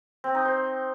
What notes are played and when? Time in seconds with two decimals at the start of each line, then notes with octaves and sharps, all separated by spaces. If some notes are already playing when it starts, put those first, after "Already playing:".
0.24 C4
0.35 D#4
0.45 C5